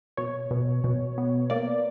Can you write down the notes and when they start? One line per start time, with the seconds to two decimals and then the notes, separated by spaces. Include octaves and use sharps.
0.17 B2 C#5
0.51 B2
0.84 B2
1.18 B3
1.50 A#3 D5